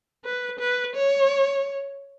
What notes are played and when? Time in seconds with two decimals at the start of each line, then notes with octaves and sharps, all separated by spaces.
0.24 B4
0.59 B4
0.95 C#5